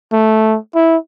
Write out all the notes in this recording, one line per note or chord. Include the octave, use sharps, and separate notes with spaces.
A3
E4